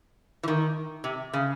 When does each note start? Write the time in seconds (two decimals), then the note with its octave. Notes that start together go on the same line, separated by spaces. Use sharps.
0.43 E3
0.48 D#3
1.04 C3
1.33 C#3